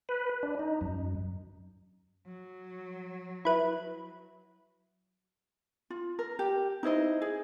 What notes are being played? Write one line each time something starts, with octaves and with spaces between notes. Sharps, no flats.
B4
D4
D#4
F#2
F#3
E4 B4
F4
A#4
G4
D#4 E4 C5 D#5
G#4